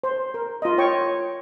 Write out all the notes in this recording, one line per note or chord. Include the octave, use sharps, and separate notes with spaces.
C5
A#4
F4 D#5
F4 C#5 G5 C#6